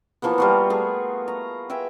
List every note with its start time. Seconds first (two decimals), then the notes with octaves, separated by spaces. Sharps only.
0.22 E3 F3 A#3 B3
0.38 G3 F4 F#4
0.70 A3 G#4
1.28 A#5
1.70 B4 E5 G5 G#5